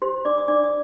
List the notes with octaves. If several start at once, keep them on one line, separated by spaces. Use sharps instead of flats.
G4 C5 C6
D4 D5 D6
D#6
D4 D5 D6
D#6